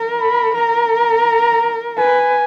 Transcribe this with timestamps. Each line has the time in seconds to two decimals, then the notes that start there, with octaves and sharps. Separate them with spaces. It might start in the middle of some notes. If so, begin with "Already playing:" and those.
Already playing: A#4
0.21 B5
0.55 A#4 A#5
1.98 B4 G#5